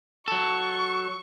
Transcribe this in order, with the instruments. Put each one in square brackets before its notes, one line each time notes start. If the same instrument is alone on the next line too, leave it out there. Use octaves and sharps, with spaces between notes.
[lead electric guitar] F#3 A4 [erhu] C#6